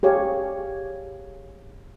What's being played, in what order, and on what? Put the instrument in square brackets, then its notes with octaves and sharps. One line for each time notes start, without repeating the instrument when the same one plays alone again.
[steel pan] G4 G#4 C#5 F5